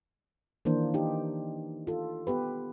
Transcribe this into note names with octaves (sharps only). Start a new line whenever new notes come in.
D#3 E3 A#3 D4 C5
D#4 G4
F4 A4
B3 G4 B4